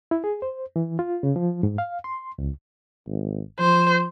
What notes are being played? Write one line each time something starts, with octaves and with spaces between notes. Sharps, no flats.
E4
G#4
C5
E3
F4
C#3
F3
G#2
F5
C6
C#2
G#1
F3 C5